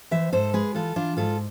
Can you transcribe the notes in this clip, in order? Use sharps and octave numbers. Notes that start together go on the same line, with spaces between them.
E3 C5 E5
G#2 A4 C5
G#3 G#4 B4
E3 F4 A4
E3 D4 F4
G#2 F4 A4